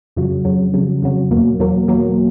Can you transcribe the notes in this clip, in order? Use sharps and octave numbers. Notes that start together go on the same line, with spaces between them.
F2 C#3 F#3
F2 C#3 F#3
F2 C#3 F#3
F2 C#3 F#3
E2 B2 F#3 A#3
E2 B2 F#3 A#3
E2 B2 F#3 A#3